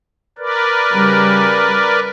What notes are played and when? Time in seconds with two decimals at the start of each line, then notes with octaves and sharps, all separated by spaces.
0.38 A#4 B4 D5
0.93 C#3 G3